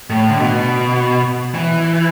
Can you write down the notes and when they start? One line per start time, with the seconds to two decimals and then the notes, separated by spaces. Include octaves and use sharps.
0.10 A2
0.29 D3
0.40 B2
1.55 E3